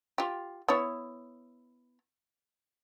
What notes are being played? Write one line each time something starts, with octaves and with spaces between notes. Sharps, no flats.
F4 G4
B3 E4 C#5